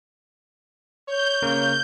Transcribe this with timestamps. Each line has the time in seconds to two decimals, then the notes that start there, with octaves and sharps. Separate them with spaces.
1.08 C#5 G6
1.42 C#3 A#3 A#4